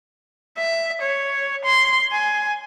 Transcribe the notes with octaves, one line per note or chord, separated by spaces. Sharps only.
E5
C#5
C6
G#5